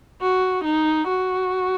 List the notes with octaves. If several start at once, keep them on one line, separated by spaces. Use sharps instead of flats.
F#4
D#4
F#4